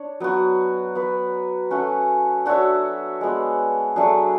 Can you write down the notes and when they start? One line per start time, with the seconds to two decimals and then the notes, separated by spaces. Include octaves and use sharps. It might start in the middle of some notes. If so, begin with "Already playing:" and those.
Already playing: D4 C#5
0.20 F#3 B3 F#4
0.95 B3 F#4 B4
1.70 A3 C#4 F#4
2.46 D4 F#4 C#5 E5
3.21 G#3 B3 F#4
3.96 F#3 A3 D4 G#4